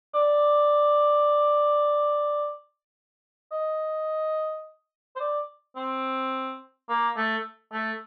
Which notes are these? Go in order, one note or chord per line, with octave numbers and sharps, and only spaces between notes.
D5
D#5
C5
D5
C4
A#3
A3
A3